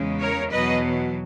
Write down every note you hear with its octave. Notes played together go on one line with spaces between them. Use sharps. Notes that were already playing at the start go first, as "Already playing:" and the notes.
Already playing: E2 C#3 G#3
A#4 C#5
E2 B2 F#3 B4 D#5